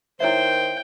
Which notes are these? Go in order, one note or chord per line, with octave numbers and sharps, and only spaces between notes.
D#3 E4 C5 C#5 E5 G5